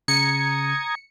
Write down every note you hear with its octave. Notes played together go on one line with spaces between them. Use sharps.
C#3 A#5 D#6 G#6 C#7